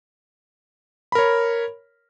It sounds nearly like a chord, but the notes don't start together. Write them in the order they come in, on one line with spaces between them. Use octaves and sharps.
B5 A#4 C#5